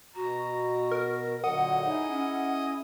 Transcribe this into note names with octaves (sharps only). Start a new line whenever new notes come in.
B2 F#4 A#5
A#4
A#2 D3 F#3 D#5 F#5
D#4 E4 G#4
C#4